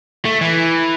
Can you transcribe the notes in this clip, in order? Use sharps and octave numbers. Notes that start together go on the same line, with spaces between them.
A3
E3